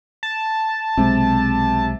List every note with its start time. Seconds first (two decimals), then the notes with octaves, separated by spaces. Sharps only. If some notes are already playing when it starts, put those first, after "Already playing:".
0.23 A5
0.97 B1 C3 G#3